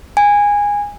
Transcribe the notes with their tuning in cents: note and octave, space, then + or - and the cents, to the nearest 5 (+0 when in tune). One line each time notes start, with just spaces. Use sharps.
G#5 -15